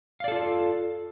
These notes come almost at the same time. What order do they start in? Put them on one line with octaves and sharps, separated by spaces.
F5 D5 A4 F4